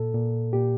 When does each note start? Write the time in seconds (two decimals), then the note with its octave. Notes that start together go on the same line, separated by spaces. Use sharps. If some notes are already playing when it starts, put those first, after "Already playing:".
Already playing: A#2 A4
0.14 A#2
0.53 A#2 G4